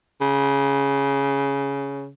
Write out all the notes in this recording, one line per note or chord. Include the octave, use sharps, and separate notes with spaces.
C#3